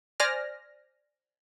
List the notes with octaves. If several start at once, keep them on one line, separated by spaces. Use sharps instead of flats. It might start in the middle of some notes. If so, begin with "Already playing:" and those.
C5 D5 G#5 F6 A#6